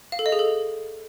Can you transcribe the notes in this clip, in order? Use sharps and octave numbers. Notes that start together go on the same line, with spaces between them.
F5
A4
D#5
G#4
A4